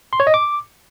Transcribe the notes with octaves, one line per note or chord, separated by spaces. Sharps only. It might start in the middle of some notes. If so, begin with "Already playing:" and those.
C6
C#5
D#5
D6